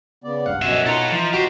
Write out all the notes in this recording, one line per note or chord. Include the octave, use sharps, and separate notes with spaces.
C#3 B3 D5
G#1 C#2 G2 F5 F#5
F#2 B2 G#4 E5
B2 D#4 F4 A4 C#5
E3 F3
B1 F#4 G4 C5